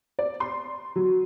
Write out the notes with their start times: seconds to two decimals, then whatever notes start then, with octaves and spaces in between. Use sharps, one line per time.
0.19 D5
0.40 C6
0.96 F#3